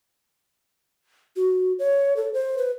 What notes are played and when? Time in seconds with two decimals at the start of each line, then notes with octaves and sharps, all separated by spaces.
1.36 F#4
1.79 C#5
2.16 A4
2.34 C5
2.58 B4